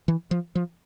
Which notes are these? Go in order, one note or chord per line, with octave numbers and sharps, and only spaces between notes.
E3
F3
F3